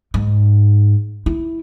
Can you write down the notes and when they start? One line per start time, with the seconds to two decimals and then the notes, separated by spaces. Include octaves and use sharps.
0.14 G#2
1.26 E4